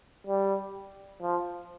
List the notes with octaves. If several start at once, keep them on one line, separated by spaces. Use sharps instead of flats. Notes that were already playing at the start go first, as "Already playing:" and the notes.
G3
F3